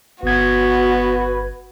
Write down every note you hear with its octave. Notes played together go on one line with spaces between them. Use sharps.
G1 B3 F#4 B4 G#6